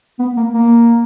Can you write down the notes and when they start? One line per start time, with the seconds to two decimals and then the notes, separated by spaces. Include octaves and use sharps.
0.19 B3
0.37 A#3
0.54 A#3